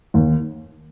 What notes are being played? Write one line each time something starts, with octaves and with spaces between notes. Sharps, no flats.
D#2